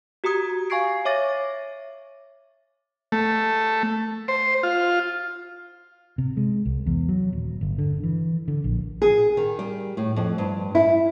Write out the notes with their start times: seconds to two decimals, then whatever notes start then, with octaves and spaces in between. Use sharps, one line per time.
0.24 F#4 G4 A#5 D#6 G#6
0.70 F5 G#5 C#6 G#6 C7 D7
1.05 C#5 E5 D6 A6 A#6
3.12 A3
4.28 C5
4.63 F4
6.18 C3
6.37 G#3
6.65 C2
6.86 E2
7.09 F#3
7.33 D#1
7.61 G1
7.78 D3
8.03 E3
8.48 D3
8.64 A#1
9.02 G#4
9.37 D#3
9.59 G3
9.97 A2
10.16 F2
10.38 G2
10.75 E4